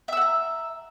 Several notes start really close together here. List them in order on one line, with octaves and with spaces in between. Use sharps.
E5 E6 F#5 A#5